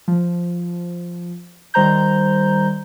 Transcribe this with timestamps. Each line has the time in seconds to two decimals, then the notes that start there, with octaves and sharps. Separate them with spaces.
0.08 F3
1.74 D#3 G3 C5 A#5 G6